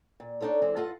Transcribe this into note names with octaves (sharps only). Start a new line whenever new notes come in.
A#2
D4 D#4 F4 A4 C#5
E3 G#3 C4
G2 F4 A4 D#5 F5 F#5